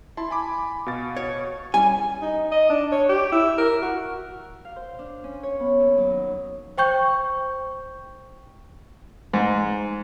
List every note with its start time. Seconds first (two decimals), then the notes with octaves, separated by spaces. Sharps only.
0.17 E4 A5 C6
0.30 G#5 B5 D6
0.86 B2 F5 A6
1.17 C#5
1.74 G3 C#4 E4 G#5
2.22 D#4
2.52 D#5
2.70 D4
2.92 C#5
3.09 G4
3.32 E4
3.58 A#4
3.82 F#4
4.65 F5
4.76 C5
4.99 D4
5.24 C#4
5.43 C#5
5.60 B3
5.80 D#2
5.97 F#3
6.10 D#4
6.78 C5 G5 C#6 G6
9.33 G#2